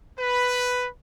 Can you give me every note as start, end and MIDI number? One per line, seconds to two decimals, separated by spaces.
0.18 0.88 71